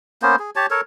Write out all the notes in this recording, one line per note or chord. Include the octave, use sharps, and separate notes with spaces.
A#3 B3 C#4 C5
G#4
G4 C#5 A5
A4 A#4 C#5